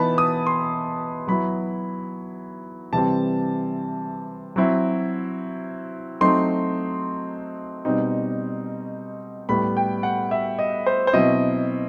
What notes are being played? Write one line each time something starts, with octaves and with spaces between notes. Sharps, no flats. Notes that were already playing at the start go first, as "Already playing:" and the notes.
Already playing: E3 B3 D#4 A5 B5
D#6
C6
F#3 B3 E4 B5
C3 E3 G3 C4 A5
F#3 C4 E4
F#3 A3 C4 D#4 C6
B2 G3 C4 D#4
A2 G3 B3 B5
G5
F#5
E5
D#5
C5
C5
B2 F#3 C4 E4 D#5